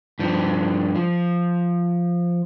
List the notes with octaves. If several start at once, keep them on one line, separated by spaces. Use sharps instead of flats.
G2 F3
F3